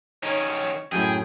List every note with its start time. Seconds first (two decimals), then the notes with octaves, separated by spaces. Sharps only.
0.23 D#3 C#4 D#4 C#5
0.92 F#2 A2 G#4 G5